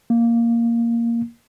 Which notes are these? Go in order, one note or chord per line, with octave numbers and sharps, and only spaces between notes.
A#3